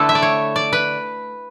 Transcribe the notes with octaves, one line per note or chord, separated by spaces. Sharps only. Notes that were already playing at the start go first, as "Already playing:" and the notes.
Already playing: D3 A3 E4 A4 B4
E5
D5
C#5
D5
B4